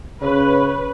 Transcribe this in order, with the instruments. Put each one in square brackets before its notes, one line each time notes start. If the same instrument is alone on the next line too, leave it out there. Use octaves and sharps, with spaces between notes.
[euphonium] C#3 [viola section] B4 [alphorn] C#5